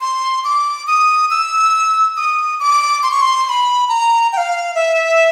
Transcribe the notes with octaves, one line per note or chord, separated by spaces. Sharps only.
C6
D6
D#6
E6
D#6
D6
C6
C#6
C6
C6
B5
A#5
G5
F5
E5